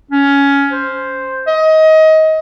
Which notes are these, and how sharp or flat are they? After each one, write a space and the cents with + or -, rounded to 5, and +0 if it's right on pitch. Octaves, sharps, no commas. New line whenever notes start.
C#4 +15
C5 +0
D#5 +25